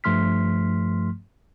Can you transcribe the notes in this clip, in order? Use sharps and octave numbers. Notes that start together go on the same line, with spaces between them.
G2 F3 A3 C6 F6 B6